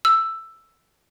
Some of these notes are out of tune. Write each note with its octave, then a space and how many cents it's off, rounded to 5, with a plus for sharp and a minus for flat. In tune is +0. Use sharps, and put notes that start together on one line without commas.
E6 +5